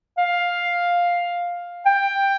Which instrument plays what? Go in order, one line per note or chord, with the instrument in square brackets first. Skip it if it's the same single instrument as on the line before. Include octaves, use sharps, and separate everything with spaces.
[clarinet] F5
G5